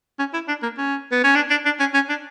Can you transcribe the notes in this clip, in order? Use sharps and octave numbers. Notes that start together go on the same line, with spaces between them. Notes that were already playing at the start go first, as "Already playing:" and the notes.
C#4
E4
D4
A#3
C#4
B3
C#4
D4
D4
D4
C#4
C#4
D4